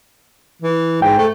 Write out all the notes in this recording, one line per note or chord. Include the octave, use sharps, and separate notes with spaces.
E3
G#2 G5
A3